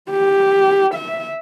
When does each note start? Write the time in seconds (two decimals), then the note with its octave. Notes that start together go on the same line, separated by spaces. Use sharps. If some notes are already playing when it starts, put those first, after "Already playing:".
0.11 G4
0.95 E5